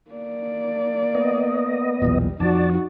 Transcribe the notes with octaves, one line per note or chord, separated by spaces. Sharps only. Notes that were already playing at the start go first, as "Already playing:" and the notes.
A#3 D5
B3 D#5
B1 E2 A#2 G3
F2 F3 D#4 F#4 D5 A5